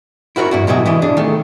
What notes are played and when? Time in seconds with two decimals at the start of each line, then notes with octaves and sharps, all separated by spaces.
0.36 E4 F#4 A#4 B4 C#5
0.51 G2 E4 F#4
0.67 G#2 B2 F#3 G4 G#4 E5
0.86 C2 E3 E4 D#5
1.02 D4 G#4
1.17 D#3 A3